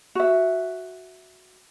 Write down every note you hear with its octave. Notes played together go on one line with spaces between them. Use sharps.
F#4 E5